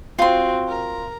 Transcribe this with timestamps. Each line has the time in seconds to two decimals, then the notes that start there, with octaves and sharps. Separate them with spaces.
0.19 C4 F4 F#4 C6
0.68 A#4